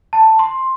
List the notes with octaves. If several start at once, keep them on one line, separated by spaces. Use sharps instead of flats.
A5
C6